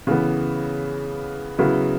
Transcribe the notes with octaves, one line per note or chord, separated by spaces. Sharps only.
C#3 E3 B3
C#3 F#3 B3 E4